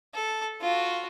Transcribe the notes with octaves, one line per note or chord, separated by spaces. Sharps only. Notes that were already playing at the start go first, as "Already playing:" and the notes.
A4
F4 F#4